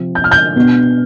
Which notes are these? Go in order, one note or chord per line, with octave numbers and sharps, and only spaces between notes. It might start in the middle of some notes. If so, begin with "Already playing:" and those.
Already playing: C3 F3 C4
G6
F6
G6
B2 B3 D4